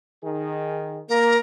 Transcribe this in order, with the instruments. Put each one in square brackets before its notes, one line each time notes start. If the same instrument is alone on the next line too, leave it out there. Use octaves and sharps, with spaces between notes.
[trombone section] D#3 G#4
[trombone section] A#3 [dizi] A#4